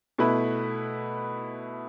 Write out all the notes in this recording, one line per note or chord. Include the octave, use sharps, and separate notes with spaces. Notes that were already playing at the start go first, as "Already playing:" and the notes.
B2 A3 E4 B4